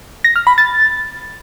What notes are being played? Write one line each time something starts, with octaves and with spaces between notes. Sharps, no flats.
A#6
F6
B5
A6